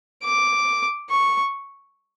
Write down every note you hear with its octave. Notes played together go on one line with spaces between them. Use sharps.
D6
C#6